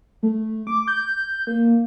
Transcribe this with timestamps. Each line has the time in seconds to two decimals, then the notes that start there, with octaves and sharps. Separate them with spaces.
0.23 A3
0.67 D6
0.88 G6
1.47 A#3